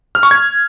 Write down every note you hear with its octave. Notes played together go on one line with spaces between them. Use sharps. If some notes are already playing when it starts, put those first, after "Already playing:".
F6
C#6
G#6